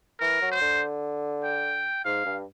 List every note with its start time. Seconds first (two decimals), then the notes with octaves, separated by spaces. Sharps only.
0.20 E3 A#4
0.42 F#3
0.52 C5
0.61 D3
1.44 G5
2.05 G#2 F5
2.26 G2